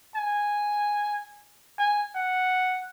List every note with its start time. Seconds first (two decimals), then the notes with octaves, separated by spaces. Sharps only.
0.15 G#5
1.79 G#5
2.15 F#5